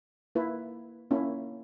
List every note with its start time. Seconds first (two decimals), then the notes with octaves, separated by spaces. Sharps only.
0.35 A#3 E4 B4
1.11 A#3 C#4 E4